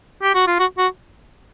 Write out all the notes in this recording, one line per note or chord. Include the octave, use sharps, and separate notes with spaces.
G4
F#4
F4
F#4
F#4